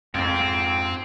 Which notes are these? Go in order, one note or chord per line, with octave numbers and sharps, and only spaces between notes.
F2 G#2 C4